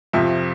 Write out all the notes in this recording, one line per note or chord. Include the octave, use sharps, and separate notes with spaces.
F2 C3 F3 E5